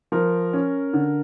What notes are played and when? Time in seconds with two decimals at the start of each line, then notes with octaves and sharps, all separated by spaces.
0.12 F3 A#4
0.53 C#4
0.93 D3